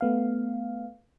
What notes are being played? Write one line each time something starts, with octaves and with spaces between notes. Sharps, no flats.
A3 B3 F5